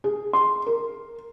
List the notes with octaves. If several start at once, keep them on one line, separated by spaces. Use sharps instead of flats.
G#4
C6
A#4